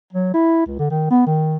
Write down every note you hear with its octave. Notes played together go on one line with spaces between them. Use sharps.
F#3
E4
C#2
D3
D#3
B3
D#3